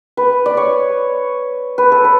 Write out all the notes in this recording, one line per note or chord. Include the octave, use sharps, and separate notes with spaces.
B4
D5
C#5
B4
A4
B4